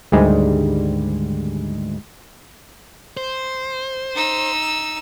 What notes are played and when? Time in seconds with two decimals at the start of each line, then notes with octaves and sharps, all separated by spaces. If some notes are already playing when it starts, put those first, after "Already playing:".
0.12 D2 G#2 D#3 G3 G#3
3.17 C5
4.15 D#4 E6